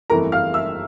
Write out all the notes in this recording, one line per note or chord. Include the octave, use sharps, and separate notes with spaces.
G1 F2 E3 A3 E4 A#4 A#5
F5 F6
E5 E6